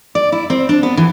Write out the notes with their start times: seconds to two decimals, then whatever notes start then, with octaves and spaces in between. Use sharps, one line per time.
0.15 D5
0.32 E4
0.50 C4
0.69 D4
0.83 B3
0.97 E3